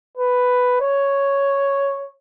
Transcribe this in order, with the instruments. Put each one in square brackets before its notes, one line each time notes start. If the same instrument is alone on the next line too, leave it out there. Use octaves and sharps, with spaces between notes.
[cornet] B4
C#5